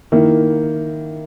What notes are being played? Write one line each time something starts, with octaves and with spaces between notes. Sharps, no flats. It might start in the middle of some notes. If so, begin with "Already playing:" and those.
D#3 A#3 E4